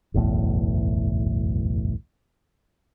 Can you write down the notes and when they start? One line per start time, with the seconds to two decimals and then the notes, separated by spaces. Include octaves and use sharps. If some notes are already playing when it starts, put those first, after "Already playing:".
0.14 F#1 B1 E2 A2